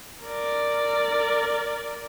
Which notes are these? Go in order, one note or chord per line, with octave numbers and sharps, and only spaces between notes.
A#4 D5